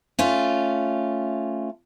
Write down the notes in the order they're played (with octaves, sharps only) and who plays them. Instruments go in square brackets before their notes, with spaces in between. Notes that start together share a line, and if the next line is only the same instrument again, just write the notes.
[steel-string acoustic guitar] A3 C#4 F4